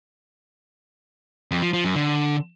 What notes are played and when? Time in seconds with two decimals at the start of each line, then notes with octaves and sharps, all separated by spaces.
1.51 F2
1.62 F3
1.73 F3
1.84 F#2
1.95 D3